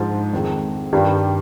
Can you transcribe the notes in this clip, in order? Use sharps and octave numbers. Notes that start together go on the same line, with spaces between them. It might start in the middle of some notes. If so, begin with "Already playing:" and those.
Already playing: G#2 F3 G#3
F2 D#3 G#3
G2 D#3 G3